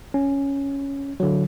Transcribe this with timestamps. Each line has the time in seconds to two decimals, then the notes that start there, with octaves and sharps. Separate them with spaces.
0.14 C#4
1.20 D3 F#3